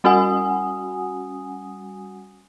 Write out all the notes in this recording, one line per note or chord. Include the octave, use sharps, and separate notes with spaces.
G3 C#4 F#4 F#5 G#5 D#6